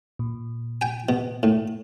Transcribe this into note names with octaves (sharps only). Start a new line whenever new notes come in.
A#2
G5 G#5
B2
A2